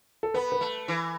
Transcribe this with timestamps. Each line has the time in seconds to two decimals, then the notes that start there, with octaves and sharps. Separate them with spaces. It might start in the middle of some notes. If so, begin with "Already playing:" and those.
0.23 A4
0.34 B3 B4
0.52 B4
0.61 A3
0.88 E3